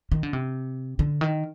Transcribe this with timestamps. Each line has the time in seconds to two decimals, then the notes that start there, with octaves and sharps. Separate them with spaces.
0.12 D#3
0.23 D3
0.33 C3
0.99 D3
1.21 D#3